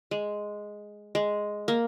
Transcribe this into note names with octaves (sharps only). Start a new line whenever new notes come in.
G#3
G#3
A#3